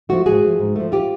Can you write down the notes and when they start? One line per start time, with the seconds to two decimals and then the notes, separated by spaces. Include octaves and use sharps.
0.09 F3 A3 F#4
0.25 G#2 F#4 G#4
0.43 F3 A3
0.59 G#2
0.76 F3 A3
0.92 F4 G4